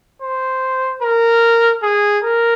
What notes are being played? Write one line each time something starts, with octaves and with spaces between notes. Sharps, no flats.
C5
A#4
G#4
A#4